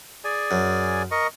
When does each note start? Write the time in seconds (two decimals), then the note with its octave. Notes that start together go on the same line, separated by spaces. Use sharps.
0.24 G#4 D5 G#5
0.51 F#2
1.11 A#4 D#5 C#6